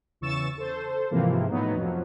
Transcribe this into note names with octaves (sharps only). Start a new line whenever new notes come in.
E2 C#3 C#6 E6 A6 E7
A4 C5
G#2 C3 E3 F3 A#3
A2 F#3 B3 D#4
F2 F3 F#3